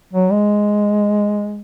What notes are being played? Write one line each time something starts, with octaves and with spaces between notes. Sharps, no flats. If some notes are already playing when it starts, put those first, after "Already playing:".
F#3
G#3